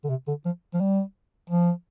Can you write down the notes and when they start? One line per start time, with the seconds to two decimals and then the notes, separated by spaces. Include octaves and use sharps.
0.04 D3
0.09 C3
0.28 D3
0.45 F3
0.74 F3
0.80 G3
1.50 F3